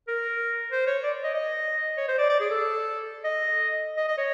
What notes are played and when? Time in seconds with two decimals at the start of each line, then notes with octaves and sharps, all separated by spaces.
0.08 A#4
0.72 C5
0.87 C#5
1.03 D5
1.24 D#5
1.34 D#5
1.97 C#5
2.08 C5
2.18 D5
2.30 D5
2.40 G#4
2.50 A4
3.24 D#5
3.97 D#5
4.08 D#5
4.18 C#5